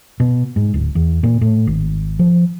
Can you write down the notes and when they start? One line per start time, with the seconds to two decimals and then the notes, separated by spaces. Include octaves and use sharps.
0.20 B2
0.56 G#2
0.74 D1
0.95 E2
1.23 A#2
1.41 A2
1.67 G#1
2.19 F3